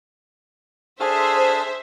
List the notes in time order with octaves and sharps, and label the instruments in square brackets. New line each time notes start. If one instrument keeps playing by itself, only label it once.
[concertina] D4 A4 F6 [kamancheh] G#4 [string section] C5 E5